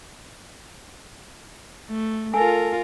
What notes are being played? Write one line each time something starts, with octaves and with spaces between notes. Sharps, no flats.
A3
F4 A4 A#4 G#5